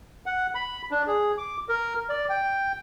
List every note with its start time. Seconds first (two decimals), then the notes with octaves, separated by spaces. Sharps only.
0.26 F#5
0.55 B5
0.91 D4
1.07 G#4
1.38 D6
1.69 A#4
2.10 D5
2.29 G5